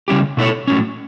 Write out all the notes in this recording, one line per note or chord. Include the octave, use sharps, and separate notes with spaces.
C#3 G3 C#4 E4 G4
B2 A3 E4 A4 C#5
A2 F#3 C#4